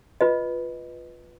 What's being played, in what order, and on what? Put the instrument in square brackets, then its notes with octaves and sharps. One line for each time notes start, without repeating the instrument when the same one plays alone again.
[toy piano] F4 B4 D#5